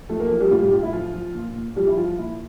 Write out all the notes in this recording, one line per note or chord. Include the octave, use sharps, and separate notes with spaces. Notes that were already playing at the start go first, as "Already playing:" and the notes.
F3 A3 A4
A#3 A#4
F3 A#3 A#4
G3 G4
A2 F4
G3 G4
A2 F4
E4
F3 F4
F3
A#2
A#2
F3 G3 G4
E4
F3 F4
A#2 E4